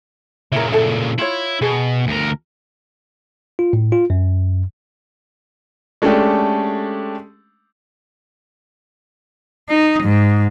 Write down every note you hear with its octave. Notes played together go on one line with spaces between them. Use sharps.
A#2 C#3 E4 A#4
E4 A4 A5
E4 F4 C#5
B2 G#4
D2 A#4
F4
A2
F4
F#2
G#3 A3 C#4 D4 G4 A4
D#4
G#2